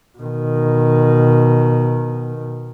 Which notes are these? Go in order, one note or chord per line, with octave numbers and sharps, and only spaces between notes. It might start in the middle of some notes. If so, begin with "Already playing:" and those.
B2 D#3